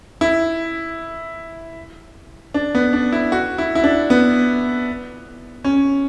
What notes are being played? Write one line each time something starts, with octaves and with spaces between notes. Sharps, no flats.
E4
D4
B3
D4
E4
F#4
E4
E4
D4
B3
C#4